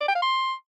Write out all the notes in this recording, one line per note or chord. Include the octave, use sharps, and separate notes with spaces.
D5
G5
F5
C6